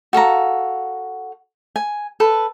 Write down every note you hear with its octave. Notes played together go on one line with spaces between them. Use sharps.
F#4 A4 F5 A#5
G#5
A4 B4